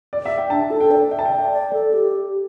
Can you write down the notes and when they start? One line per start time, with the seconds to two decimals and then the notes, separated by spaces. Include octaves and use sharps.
0.13 D5
0.26 E5
0.38 G5
0.50 D4 A5
0.71 A4
0.80 G5
0.91 D5
1.11 E5 G5
1.19 A5
1.25 G5
1.31 D5
1.52 D5
1.73 A4
1.93 G4